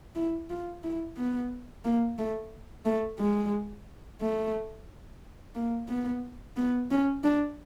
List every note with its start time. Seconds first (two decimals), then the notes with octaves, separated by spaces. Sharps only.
0.15 E4
0.50 F4
0.84 E4
1.17 B3
1.85 A#3
2.18 A3
2.85 A3
3.19 G#3
4.21 A3
5.55 A#3
5.89 B3
6.57 B3
6.91 C#4
7.24 D4